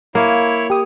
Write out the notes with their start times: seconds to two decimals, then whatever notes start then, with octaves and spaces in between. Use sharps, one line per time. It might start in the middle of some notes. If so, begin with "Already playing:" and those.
0.15 A#3 E4 C#5 F5
0.70 G4 D#6